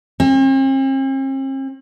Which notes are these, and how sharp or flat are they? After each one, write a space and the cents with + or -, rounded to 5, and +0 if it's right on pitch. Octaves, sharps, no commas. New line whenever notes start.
C4 +45